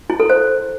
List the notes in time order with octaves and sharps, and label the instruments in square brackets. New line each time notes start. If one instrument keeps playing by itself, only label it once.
[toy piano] E4
A4
C5